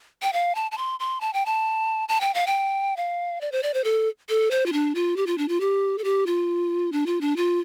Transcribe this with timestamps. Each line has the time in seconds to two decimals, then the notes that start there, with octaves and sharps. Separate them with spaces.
0.22 G5
0.33 F5
0.55 A5
0.71 A5
0.78 C6
1.00 C6
1.21 A5
1.34 G5
1.46 A5
2.09 A5
2.21 G5
2.34 F5
2.47 G5
2.97 F5
3.41 D5
3.52 C5
3.63 D5
3.74 C5
3.84 A4
4.29 A4
4.51 C5
4.66 F4
4.73 D4
4.95 F4
5.17 G4
5.27 F4
5.38 D4
5.48 F4
5.60 G4
5.98 A4
6.04 G4
6.26 F4
6.92 D4
7.06 F4
7.21 D4
7.37 F4